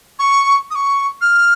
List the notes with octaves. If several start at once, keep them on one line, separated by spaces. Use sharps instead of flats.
C#6
D#6
C#6
F6